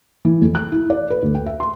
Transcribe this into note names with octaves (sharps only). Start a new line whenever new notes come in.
E3
F2
F#6
E4
D5
B4
D2
G5
E5
C6